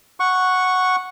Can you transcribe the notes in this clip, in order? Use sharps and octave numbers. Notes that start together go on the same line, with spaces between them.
F#5 C#6